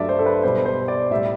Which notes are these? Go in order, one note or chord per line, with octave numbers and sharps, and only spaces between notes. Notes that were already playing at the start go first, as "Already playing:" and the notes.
Already playing: G2 F#3 A3 D5 E5
C5
A4
B4
B2 G3 C5
C5
D5
A2 G3 E5